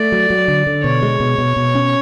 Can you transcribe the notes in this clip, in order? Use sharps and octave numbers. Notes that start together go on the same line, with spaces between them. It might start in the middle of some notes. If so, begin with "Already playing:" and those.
Already playing: A3 D5
F#3
F#3
D3
D3
B2 C#5
G#3
B2
B2
B2
C#4